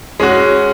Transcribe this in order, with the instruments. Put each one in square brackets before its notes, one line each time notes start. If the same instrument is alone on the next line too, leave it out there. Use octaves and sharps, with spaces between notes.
[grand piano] G#3 C#4 F#4